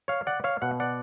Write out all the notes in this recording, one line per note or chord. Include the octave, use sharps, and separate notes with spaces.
C#5 F5
D5 F#5
C#5 F5
B2 F#5
D5 F#5